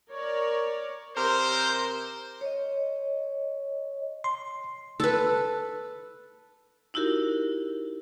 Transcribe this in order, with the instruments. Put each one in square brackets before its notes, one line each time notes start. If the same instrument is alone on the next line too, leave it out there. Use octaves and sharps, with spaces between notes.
[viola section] A#4 C#5 D5
[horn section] C3 A#4 C5
[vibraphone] C#5 D#5
[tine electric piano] C6
[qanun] A4 B4
[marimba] D#4 E4 F#4 G4 A#4